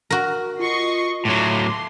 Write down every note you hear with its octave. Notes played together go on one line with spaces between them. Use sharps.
F#4 A#4
F4 D#5 C#6 C7
A2 F#3 C6 D6